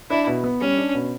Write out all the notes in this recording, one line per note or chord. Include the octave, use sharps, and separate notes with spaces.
D4 E4
B2
B3
G3 C#4
D4
B2